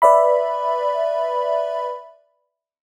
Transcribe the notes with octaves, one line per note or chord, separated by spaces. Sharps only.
B4 D5 E5 B5